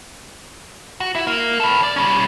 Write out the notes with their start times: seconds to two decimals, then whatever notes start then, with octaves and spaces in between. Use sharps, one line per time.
1.00 F#4
1.15 E4
1.27 A#3
1.60 A4 B4
1.83 D5
1.96 G3 C#4